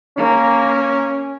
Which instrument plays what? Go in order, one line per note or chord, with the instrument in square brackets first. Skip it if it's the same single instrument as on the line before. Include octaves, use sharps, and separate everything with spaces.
[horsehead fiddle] A#3 A#4 [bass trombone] C#4